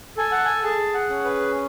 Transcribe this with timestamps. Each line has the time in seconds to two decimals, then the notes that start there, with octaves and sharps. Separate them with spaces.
0.17 A4 G#5
0.32 F#5
0.45 G#5
0.63 G#4 A5
0.94 F#5
1.10 C#4
1.24 B4